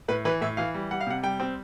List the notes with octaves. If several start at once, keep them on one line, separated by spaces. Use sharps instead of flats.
A2 B4
E3 B4
A2 E5
E3 F5
G3
G3 F#5
F5
C3 F#5
G3 G5
C4